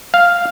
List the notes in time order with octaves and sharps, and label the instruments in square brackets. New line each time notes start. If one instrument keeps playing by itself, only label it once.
[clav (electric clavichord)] F5